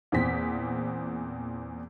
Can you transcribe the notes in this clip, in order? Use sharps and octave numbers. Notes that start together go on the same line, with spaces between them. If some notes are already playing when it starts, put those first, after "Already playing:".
E2 A#2 C4 B6